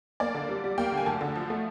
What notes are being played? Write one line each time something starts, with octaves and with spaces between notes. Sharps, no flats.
A#3 D5
D3
G3
G3
A#3 G5
D3
G#5
D2 A5
D3
F3
A3